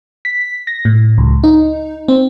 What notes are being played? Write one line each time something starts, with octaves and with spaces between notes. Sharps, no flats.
B6
A#6
A2
C#2
D#4
C4